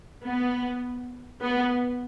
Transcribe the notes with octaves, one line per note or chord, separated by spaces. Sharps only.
B3
B3